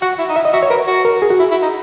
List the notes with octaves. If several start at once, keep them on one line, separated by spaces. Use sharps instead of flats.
F#4 F#5
E4
D#4
E4 E5
D#5
F#4 E5
C#5
A#4 B4
F#4
A#4
G#4
F#4
E4
E4
D#4